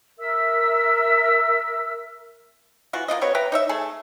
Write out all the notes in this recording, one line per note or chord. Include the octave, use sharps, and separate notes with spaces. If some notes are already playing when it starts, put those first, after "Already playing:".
A#4 E5 E6
E3 F4 F#4
A#3 D4 F4 D#5
C4 F#4 B4 C#5
B4 E5 G5 A#5
D#4 C#5 E5
A3 G#4 A4